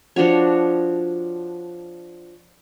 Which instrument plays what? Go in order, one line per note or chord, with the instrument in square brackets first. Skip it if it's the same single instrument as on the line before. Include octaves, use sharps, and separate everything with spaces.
[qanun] F3 D4 F#4 C#5